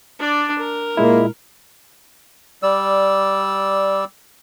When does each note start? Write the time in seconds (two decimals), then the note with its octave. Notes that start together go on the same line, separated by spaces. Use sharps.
0.19 D4 D5
0.58 A#4
0.97 A#2 G#3 A#3 E4
2.63 G3 D5 E6